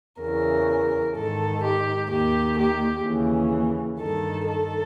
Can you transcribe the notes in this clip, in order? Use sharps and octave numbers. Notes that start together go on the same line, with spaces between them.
E2 C#3 E3 A#4
G#2 D#3 A4
G4
D#2 D#3 G4
G4
D#2 C#3 E3
G2 D#3 A4
A4